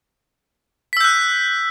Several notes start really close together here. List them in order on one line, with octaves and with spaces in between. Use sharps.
B6 E6 G6 F#6